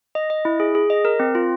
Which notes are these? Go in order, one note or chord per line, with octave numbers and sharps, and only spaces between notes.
D#5
D#5
E4
G#4
G#4
D#5
A#4
C4
F4